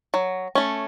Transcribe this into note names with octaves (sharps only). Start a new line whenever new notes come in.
F#3
A3 C#4